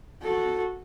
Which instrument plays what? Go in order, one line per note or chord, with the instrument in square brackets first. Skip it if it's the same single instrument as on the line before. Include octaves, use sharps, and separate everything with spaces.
[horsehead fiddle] F#4 A4